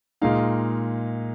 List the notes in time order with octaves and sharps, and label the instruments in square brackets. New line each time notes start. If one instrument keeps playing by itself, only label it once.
[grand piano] A#2 G#3 D#4 F5